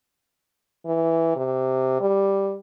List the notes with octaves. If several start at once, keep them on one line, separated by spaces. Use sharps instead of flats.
E3
C3
G3